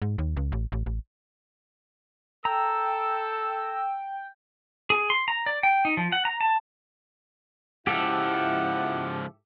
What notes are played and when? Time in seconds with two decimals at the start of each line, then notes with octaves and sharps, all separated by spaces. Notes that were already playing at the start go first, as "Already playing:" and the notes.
0.02 G#2
0.18 D#2
0.37 C#2
0.52 A1
0.72 A1
0.86 A1
2.45 A4 G5 A#5 E6
4.90 G#4
5.10 C6
5.28 A#5
5.46 D5
5.63 G5
5.85 D#4
5.97 F3
6.12 F#5
6.25 A#5
6.41 A5
7.87 C#2 G#2 F3 E4 G4 A4 E5 F#5